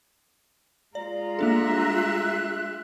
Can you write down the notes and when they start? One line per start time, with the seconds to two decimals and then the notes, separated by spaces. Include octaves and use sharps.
0.95 G#3 F4 D5 A#5
1.39 A#3 D4 A4 E5 F#6